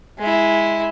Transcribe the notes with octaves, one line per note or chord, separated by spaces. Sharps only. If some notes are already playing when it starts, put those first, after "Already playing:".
G#3 E4